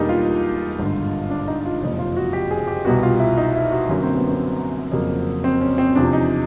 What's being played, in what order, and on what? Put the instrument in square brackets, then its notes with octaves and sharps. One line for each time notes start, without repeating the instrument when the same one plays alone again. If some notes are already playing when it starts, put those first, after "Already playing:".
Already playing: [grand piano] E1 E2 B2 G3 A#3 D4 D#4
F4
G#1 G2 D3
D4
D#4
F4
F#1 F2 C3 F4
F4
F#4
G4
G#4
G4
C2 B2 G3 B3 F#4
F4
E4
D#4
E4
F#4
F#2 D3 F#3 A#3 C#4
C4
B3
C4
F2 C#3 F#3 A#3
C4
C#4
C4
E2 C3 F3 D4
D#4